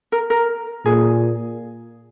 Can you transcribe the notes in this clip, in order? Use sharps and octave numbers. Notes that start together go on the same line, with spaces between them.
A#4
A#4
A#2 G#4